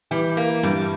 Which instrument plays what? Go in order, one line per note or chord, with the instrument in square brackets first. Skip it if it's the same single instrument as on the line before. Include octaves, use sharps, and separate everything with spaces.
[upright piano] E3 [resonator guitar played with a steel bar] G3
[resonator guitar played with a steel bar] A#3
[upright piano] G2 [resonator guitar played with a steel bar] G3